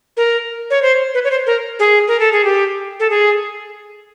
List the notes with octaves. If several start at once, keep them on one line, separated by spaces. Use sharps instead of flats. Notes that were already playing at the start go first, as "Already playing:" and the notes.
A#4
C#5
C5
B4
C#5
C5
A#4
G#4
A#4
A4
G#4
G4
A4
G#4